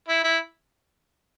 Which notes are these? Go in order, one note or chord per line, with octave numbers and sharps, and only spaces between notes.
E4
E4